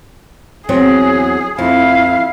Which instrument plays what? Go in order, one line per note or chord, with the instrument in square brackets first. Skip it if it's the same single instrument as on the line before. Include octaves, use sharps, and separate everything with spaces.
[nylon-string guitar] E2 F#3 C4 [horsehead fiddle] G#4
[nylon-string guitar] F2 [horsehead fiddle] E4 F5